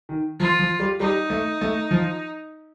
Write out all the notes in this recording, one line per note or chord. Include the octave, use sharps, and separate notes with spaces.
D#3
F3 F4
F3
G3
G3 D#4
A3
A3
F3